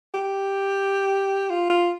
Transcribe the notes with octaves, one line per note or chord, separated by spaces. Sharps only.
G4
F4
F4